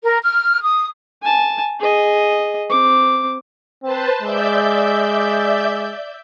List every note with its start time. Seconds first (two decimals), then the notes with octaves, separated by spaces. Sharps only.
0.04 A#4
0.23 F6
0.62 D#6
1.22 G#5 A5
1.80 G#4 D#5
2.70 C4 D6
3.83 C4 B4 C5 A5
4.22 G#3 D5 E5 G6